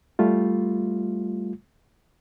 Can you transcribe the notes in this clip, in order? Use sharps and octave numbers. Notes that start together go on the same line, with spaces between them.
G3 A3 F4